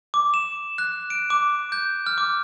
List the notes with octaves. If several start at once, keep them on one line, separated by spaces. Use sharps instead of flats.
D6
E7
F#6
D7
D6
G6
F6
D6